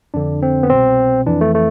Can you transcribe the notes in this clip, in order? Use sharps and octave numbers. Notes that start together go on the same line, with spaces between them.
F2 D3 D4
C4
B3
C2 B2 C4
F2 E3 D4
A3
A3